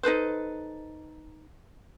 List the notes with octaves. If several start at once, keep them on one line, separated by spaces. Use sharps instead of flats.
D#4 A4 B4 C5